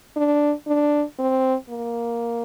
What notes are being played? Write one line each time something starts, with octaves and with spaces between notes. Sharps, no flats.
D4
D4
C4
A#3